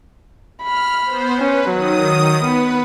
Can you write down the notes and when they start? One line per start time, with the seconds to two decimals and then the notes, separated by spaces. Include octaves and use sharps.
0.63 B5 F6
1.05 B3 C5
1.39 C#4 B4
1.69 D#3 F#3 D#6
2.45 B3 B4